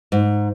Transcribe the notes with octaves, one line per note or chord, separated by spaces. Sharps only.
G#2